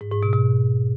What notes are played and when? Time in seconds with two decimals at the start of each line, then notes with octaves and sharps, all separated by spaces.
0.01 G#2
0.12 G#2
0.23 B2
0.33 B2